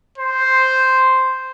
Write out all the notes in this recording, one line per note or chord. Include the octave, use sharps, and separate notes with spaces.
C5